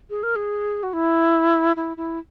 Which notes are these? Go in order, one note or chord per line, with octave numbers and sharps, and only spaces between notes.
G#4
A#4
G#4
F#4
E4
E4
E4